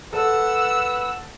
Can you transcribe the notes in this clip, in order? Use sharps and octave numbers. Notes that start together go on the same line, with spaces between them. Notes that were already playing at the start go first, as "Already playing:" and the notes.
A4 B4 F#5 E6